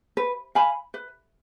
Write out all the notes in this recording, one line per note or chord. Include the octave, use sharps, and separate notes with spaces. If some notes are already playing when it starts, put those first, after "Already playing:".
B4
F5 G#5 B5
B4